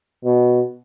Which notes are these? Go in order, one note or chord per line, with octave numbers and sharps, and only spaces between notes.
B2